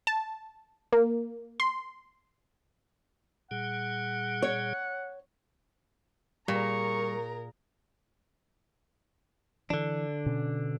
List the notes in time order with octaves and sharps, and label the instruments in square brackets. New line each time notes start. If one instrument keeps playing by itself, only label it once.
[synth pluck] A5
A#3
C6
[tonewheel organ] A#2 G3 G#4 [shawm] F#5
[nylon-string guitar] C#5
[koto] A#2 [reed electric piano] G3 [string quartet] G#4 A#4 A#5 [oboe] C#6
[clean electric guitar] D3 D4 [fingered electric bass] E3
[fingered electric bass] B2 C#4